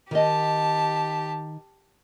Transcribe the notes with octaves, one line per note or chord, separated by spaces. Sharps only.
D#3 G4 D#5 A5